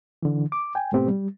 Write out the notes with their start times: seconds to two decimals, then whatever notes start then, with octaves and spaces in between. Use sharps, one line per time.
0.23 D3 E3
0.52 D6
0.75 G5 G#5
0.92 G#2 B2 A3 B3 C4 G4
1.08 G3